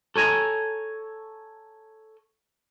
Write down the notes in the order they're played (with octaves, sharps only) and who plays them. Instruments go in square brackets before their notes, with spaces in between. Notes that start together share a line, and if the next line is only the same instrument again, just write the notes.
[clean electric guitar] A4 C#5 G#5 A#5